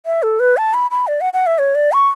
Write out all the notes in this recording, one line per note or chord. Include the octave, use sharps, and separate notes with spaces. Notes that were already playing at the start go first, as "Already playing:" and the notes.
E5
A4
B4
A5
B5
B5
D5
F#5
F#5
E5
C#5
D5
C#6